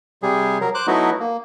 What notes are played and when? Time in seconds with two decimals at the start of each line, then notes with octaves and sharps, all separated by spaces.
0.23 C3 G3 G#4
0.61 F#3 A#4
0.75 C5 D6 F#6
0.87 F#3 A3 B3 D#4 E4 F#4
1.20 A#3